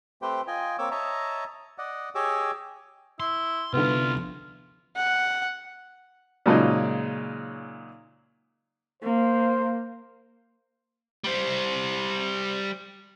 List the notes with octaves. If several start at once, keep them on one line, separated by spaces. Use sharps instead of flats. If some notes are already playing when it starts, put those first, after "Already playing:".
A3 C4 G4 B4 C5 G5
F4 D#5 G5 G#5
A#3 C4 C#5 D6 E6
C#5 D#5 E5 A5 A#5
D5 D#5 F#5
G4 G#4 C#5 D#5 D6 E6
E4 C6
C2 D3 B3 E4 F4
F#5
A#2 C#3 F#3 G#3 D#4
A#3 C5
G3 C5